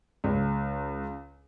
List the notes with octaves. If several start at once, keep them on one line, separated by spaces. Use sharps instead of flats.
C#2